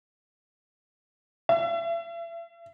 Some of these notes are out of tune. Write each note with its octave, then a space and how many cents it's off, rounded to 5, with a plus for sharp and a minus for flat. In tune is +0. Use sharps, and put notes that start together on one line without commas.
E5 +35